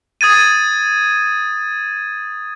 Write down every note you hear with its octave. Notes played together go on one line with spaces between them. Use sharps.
D#6 G#6 A6 D#7